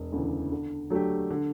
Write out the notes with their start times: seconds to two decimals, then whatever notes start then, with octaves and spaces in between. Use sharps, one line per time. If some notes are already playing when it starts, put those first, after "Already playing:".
Already playing: E1
0.12 D2 C#3 E3
0.52 D3
0.90 F#3 A3 D4 G4
1.30 D3